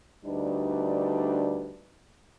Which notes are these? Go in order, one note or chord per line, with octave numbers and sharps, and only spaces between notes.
D2 G3 D4 D#4 B4